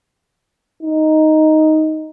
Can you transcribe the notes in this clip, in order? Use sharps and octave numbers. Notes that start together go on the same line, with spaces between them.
D#4